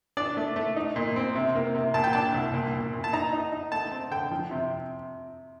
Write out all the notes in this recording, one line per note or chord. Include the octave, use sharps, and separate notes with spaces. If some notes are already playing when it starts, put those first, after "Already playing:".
D4 D5
A3
A3
D#4
A#2
C4
C3
A#3
C3
A#2 A5
G5
D4 A5
C2
A#2
A#2
A#2
A5
D#4 A#5
D#4
D#4
A3 A5
C4
D3 G5
F3
C3